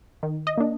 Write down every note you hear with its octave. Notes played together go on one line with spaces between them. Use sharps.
D#3
D#5
A#3 D4